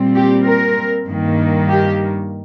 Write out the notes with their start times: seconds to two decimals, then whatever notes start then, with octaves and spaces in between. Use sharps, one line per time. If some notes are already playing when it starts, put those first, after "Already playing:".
Already playing: A#2 G3 C4
0.15 G4
0.45 A#4
1.07 G2 D#3 A#3
1.68 G4